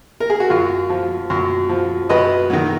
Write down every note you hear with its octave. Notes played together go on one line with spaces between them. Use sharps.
A#4
G#4
F#4
F#2 F4
F3
F#2
F3
F#2 B4 D#5
D#3 F#3